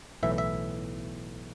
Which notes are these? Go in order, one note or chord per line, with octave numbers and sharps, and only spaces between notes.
B1 A2 E3 E5
E5